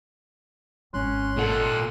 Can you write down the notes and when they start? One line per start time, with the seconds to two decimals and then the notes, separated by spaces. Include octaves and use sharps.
0.94 G#1 C#4 C6 F#6
1.37 A#2 A4 F#5